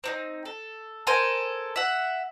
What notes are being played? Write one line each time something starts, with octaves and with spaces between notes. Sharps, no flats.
C4 D4 D#4
A4
A4 A#4 C5 G#5
E5 F#5